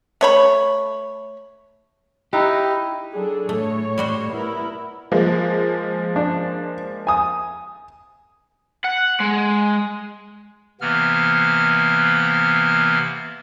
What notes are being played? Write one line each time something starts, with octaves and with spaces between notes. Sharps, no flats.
A3 C#5 B5
D#4 E4 G4 A#5 E6 F#6
F#3 D4 G#4 A4
A2 A3 C#5
G3 F#4 C5
B3 E4 A#4
F3 G#3 A#3
D4
G#5 D#6
F#5
G#3
C3 E3 A#3 B3 F6